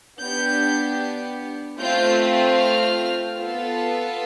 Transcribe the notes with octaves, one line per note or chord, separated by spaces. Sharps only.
B3 D4 G4 G6
A3 C4 F4 G6
F6
B3 F4 A4